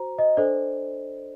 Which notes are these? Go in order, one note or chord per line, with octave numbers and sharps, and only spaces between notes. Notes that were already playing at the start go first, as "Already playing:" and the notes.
Already playing: F#4 C5 A#5
D#5
D4 A4 C5 D5